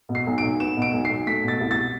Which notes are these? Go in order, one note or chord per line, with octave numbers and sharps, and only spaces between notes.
B2
C7
B1
D7
B1
B3 E7
B2 D7
B1
C7
B1
A3 B6
B2 A6
C2
A6